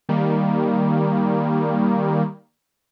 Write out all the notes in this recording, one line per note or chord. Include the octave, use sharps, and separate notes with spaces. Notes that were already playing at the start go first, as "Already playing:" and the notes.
D#3 G3 A#3